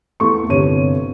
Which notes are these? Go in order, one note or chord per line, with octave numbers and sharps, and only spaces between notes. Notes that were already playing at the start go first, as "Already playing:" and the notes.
E2 A3 C#6
G1 C3 C#5 D#7